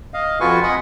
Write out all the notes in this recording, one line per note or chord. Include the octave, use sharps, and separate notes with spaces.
D#5 F5
F2 F4 F#4 B4 G#5 C#6
D#5 F#5 G#5 B5 C#6